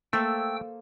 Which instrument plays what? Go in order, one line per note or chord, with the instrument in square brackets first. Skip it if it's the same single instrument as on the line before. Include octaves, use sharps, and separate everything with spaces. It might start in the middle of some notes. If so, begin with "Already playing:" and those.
[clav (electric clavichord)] A3 [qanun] A#3 A4 C5 [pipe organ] G5 E6